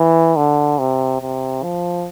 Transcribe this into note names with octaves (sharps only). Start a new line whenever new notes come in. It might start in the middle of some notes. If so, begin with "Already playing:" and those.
Already playing: E3
D3
C3
C3
F3